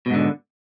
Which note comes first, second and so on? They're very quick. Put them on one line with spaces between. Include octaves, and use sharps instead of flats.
B2 G#2 D3